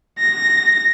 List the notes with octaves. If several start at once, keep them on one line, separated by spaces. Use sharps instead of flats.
A#6